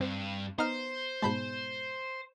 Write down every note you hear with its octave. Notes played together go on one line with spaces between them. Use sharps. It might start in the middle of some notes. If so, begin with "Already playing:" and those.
G2 C4
B3 D#4 C5 F6
G#2 B2 G#3 A5 B5 G6